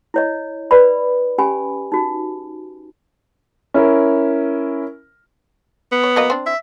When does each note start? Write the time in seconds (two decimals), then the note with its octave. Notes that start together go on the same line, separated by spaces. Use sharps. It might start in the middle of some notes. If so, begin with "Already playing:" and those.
0.14 E4 C#5 D#5
0.71 B4 D5 B5
1.38 C#4 G4 G#5 B5
1.92 D#4 F#4
3.74 C#4 E4 A#4
5.92 B3
6.04 C#5
6.16 F#3 A#3 D#5
6.30 C4 D4
6.46 E5